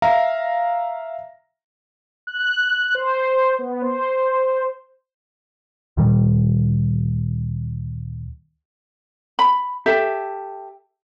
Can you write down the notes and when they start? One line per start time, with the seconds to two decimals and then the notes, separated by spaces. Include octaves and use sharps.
0.02 E5 F5 A#5 A#6
2.27 F#6
2.95 C5
3.59 B3
3.82 C5
5.97 D2 A#2 D#3 G3
9.39 B5
9.86 G4 A4 E5